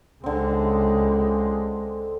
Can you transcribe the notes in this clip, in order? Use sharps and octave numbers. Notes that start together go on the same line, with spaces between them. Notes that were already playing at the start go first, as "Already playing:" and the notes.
C#2 D3 G#3 C4